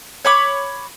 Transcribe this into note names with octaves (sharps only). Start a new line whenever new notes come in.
C#5 B5 D6